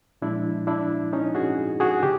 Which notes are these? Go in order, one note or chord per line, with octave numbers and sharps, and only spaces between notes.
A#2 F3 G#3 D4 E4
D4 E4
C#4 D#4
F#4 G#4
F#4 G#4
C#3 G4